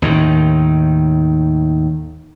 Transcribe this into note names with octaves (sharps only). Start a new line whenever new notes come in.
D#2 A2 D#3